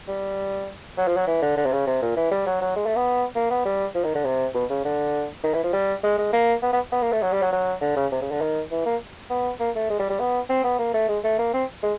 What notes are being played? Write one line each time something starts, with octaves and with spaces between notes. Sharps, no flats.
G3
F#3
F3
F#3
E3
D3
D3
C3
C#3
C3
A#2
E3
G3
F#3
F#3
G#3
A3
B3
A#3
B3
G3
F3
D#3
D3
C3
B2
C#3
D3
D#3
E3
F3
G3
G#3
G#3
A#3
B3
B3
B3
A#3
A3
F#3
G3
F#3
F#3
D3
C#3
C3
C#3
D3
D#3
E3
A#3
B3
A#3
A3
G#3
G3
G3
B3
C4
B3
A#3
A3
G#3
A3
A#3
C4
G#3